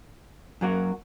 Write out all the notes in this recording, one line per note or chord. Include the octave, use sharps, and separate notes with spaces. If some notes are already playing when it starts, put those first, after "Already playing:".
F#2 F#3 A#3 F#4